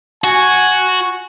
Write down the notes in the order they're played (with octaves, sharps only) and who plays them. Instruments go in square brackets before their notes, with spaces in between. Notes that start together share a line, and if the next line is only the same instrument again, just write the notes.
[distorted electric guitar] F#4 [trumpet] G#5